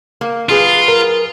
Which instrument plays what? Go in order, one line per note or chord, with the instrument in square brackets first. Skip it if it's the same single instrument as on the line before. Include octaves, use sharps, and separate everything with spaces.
[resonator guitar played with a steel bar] A#3
[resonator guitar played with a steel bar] F#3 G#4 B4 [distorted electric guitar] F4
[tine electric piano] A#4